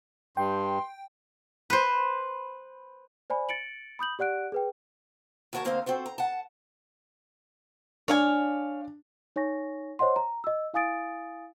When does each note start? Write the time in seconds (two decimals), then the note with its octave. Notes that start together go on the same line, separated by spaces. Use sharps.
0.37 G2 G5 C6
1.70 B4 C5
3.30 C5 D5 G#5 B5
3.49 A6 C#7 D7 F#7
3.99 B5 D#6 G6 F#7
4.19 G4 D5 F#5 F#6 D7
4.52 G#4 B4 G5
5.53 D#2 F#4 A#4 C#5 A5
5.64 D2 A#3 C4 C5 D#5 F5
5.86 C4 F#4 A4 C5
6.06 A#5
6.18 F#5 A5
8.08 D4 C#5 F5 G#5
9.36 D#4 C#5 G#5 C#6 A#6
9.99 C5 C#5 D#5 F#5 C6
10.16 A#5
10.44 D#5 E6
10.74 E4 F5 G#5 D#6 A6 D7